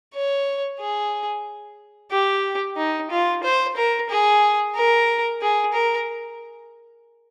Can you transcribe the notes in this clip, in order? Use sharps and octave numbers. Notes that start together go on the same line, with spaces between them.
C#5
G#4
G4
D#4
F4
C5
A#4
G#4
A#4
G#4
A#4